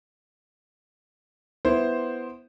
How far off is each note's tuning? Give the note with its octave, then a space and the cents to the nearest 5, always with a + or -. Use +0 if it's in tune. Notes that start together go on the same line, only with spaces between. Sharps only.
B3 +0 E4 +0 C5 +0